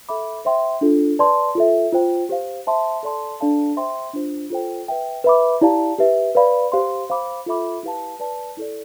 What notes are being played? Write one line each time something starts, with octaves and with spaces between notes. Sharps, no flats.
A4 E5 B5 D6
C5 E5 G5 C6
D4 F4 A4
B4 D5 A5 C6
F4 A4 E5
F4 C5 G5
G4 C5 F5
C5 E5 A5 C6
A4 D5 A5 C6
D4 A4 D5 F5 A5
C5 E5 G5 C6
D4 F4 C5
F4 A4 C5 G5
B4 E5 G5
B4 E5 B5 D6
E4 G4 D5 F5 A5
G4 B4 E5
B4 D5 F5 B5
G4 C5 F5 C6
C5 F5 B5 D6
F4 A4 E5 B5 D6
E4 G4 B4 F5 A5
B4 D5 A5
E4 A4 D5